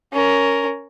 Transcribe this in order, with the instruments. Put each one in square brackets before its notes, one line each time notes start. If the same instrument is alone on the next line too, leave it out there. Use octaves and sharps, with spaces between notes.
[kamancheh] C#4 A#4